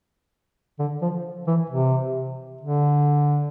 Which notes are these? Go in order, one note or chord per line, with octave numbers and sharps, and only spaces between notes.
D3
F3
E3
C3
D3